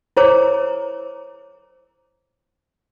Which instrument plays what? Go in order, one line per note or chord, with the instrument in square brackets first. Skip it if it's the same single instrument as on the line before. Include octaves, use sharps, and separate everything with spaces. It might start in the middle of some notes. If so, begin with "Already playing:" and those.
[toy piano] E4 A#4 C5 C#5 A#5 D6